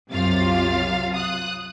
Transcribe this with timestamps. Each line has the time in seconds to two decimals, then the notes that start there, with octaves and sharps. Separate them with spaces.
0.11 C2 F#2 C3 F4 F5 A6
1.14 D#6 F#6